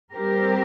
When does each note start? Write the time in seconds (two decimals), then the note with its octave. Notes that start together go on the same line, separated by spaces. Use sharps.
0.13 G3 C4 G4 A#4